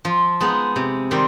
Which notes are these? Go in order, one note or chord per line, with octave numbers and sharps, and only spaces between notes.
F3
G#3 B3 D#4
C3
D#3 G3 C4